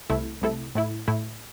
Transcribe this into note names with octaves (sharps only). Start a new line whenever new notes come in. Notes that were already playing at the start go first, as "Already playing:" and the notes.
C2 C3 A3 E4 A4
C2 C3 A3 E4 A4
A2 A3 E4
A2 A3 E4